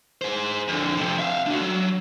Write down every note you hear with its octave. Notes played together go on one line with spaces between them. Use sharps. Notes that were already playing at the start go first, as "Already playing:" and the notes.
G#4 C5
F2 D3
F2 C3
E5 F5
D4 F#4
F#3